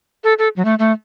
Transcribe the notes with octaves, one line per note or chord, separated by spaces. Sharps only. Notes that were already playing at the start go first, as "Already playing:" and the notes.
A4
A4
F#3
A3
A3